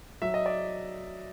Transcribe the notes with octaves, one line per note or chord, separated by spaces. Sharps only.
F#3 E5
D#5
D5